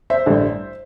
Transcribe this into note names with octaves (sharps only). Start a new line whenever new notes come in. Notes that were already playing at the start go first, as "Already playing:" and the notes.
C5 E5
A1 G2 D3